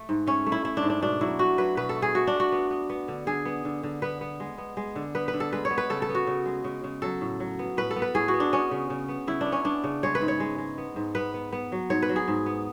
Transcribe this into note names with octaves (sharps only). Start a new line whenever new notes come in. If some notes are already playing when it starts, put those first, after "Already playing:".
Already playing: A3
G#2
A3 C#4
A3
E4
A3 E4
D4
G#2
D4
B2 D4
F#3 E4
A3 F#4
F#3 B4
B2 B4
A4
A3
G#4
A3 F#4
D4
A3
F#4
B3
B3
B3
D3
D3 G#4
B3
D3
D3
B3 B4
B3
G#3
B3
G#3
D3
B3 B4
B4
D3
A4
G#3 B4
C#5
B3
B4
C#3 A4
A4
B3
F#4
C#3
G#3
C#3
C#3
F#3 A4
A2
F#3
B3
A2 B4
A4
B3
B4
A2 G#4
F#4
B3
D4
B3 C#4
C#3
C#3
B3
C#3 E4
D4
B3
C#4
B3 D4
C#3
G#3 C#5
B4
G#2
C#5
G#3
G#3
B3
G#2
B3 B4
B3
B3
F#3
G#2 C#5
B4
F#3
G#4
G#2
B3